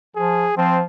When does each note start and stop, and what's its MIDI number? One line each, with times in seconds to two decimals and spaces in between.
0.16 0.46 53
0.16 0.56 68
0.57 0.83 53
0.57 0.80 60